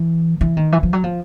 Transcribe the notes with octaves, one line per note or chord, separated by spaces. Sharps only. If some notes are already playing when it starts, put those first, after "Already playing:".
Already playing: E3
E3
D#3
E3
F3
F#3
F3